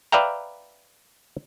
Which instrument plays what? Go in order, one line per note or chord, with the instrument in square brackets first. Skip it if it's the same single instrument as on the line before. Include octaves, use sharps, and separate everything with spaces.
[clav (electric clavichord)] B4 D5 E5 F5 G5 A#5